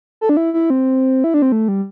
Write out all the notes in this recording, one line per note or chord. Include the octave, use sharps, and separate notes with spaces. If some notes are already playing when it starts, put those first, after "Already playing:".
A4
D4
E4
E4
C4
E4
D4
C4
A3
G3